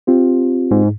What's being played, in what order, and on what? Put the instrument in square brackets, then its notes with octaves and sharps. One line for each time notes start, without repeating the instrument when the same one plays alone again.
[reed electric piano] C4 F4 G4
[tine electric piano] G#2